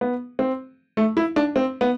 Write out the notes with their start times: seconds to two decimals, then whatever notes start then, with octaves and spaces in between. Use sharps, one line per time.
0.01 B3
0.39 C4
0.97 A3
1.17 E4
1.36 D4
1.56 C4
1.81 B3